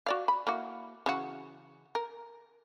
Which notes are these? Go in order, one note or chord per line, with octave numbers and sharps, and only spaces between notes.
F#4 D5 F5
B5
A#3 E4 F#4
C#3 E3 F#4
A#4